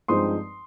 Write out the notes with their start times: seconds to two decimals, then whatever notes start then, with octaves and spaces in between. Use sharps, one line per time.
0.08 G2 F3 G#3 C4 D#4 C6 D#6